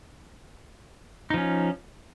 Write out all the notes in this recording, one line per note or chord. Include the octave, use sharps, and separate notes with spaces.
F3 C#4 D#4